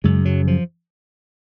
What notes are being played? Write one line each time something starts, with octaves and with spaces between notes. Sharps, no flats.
F#2 C#3 G#3
F#3
F3